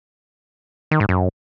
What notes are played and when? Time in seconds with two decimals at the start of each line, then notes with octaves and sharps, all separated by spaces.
0.91 D#3
1.00 G#2
1.09 F#2